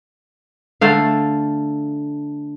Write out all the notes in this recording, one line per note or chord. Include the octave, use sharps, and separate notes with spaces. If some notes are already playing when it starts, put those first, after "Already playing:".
D3 A3 F5